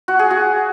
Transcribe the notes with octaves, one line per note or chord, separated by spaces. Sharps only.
F#4
G#4
F#4